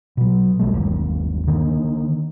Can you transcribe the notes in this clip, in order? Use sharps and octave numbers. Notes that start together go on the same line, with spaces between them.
B2 F#3
B1 G3 A3
G1 D#2
D3 D#3 A#3